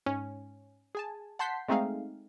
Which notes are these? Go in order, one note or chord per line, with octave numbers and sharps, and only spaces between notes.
G#2 C#4
G#4 G#5 A5
F#5 A5 C6 G6 B6 C7
G#3 A3 C4 D#4 G#4 F5